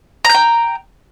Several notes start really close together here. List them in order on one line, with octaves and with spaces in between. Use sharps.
A#5 G6 G5